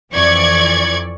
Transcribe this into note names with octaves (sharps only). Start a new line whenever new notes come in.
F2 E3 D5 C#6 G#6